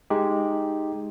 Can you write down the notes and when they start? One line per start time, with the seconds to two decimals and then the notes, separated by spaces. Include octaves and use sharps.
0.10 G#3 D#4 G4